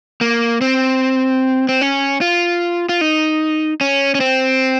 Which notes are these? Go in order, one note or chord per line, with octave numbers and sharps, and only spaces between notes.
A#3
C4
C4
C#4
F4
F4
D#4
C#4
C#4
C4